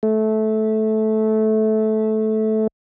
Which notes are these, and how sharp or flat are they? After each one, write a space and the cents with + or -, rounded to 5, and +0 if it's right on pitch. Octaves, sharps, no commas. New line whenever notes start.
A3 -15